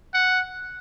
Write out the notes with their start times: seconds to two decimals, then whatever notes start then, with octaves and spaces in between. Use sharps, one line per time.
0.14 F#5